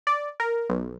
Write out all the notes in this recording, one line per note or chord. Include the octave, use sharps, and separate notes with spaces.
D5
A#4
B1